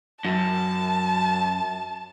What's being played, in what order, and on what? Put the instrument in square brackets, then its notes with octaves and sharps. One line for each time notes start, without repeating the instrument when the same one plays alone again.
[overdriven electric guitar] F#2 [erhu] A5